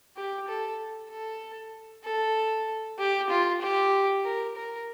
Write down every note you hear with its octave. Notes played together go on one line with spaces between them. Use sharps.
G4
A4
A4
A4
G4
F4
G4
A#4
A#4